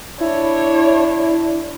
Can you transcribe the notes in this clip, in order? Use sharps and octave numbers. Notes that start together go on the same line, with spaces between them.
D4 E4 C#5